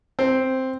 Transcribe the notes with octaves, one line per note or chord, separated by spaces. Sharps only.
C4